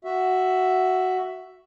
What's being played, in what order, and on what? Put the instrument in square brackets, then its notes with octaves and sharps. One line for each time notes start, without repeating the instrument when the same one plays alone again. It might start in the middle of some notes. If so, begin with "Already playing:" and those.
[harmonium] F#4 E5